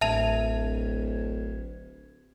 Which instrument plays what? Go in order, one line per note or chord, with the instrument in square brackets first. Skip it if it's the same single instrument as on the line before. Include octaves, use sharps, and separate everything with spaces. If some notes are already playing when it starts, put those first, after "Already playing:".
[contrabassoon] D1 [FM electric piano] A1 G#6 [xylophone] E5 A5 F7